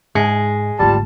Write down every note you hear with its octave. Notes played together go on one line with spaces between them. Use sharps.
G#2 G#3
G#1 D2 G3 F4 A5